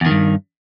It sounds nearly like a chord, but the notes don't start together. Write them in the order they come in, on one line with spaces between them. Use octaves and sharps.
E2 D#3 G2